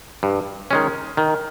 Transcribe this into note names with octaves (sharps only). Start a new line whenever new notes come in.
G2
D#3 G#3 C#4
D#3